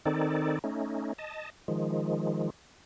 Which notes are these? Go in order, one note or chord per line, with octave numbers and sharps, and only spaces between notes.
D#3 C4 D#4 A4 D5
A3 C#4 D#4
D#5 A5
D#3 F3 G#3